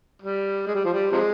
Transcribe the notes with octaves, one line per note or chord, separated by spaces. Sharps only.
G3
G#3
G3
F3
G3
C3 F3 G#3